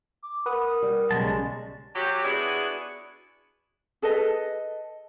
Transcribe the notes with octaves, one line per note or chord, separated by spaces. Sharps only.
D6
A#4 B4 F#5 D#6
G3
B1 C#3 G#3 A5
F#3 G4
B3 D4 E4 F#4 G#4
G#4 A4 B4 D#5